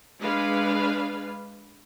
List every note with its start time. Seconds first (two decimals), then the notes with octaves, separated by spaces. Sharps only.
0.21 G#3 D4 B4 F5